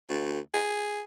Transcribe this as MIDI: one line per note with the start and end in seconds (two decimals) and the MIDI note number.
0.09 0.39 38
0.54 1.02 68